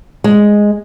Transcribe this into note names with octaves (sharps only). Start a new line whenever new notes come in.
G#3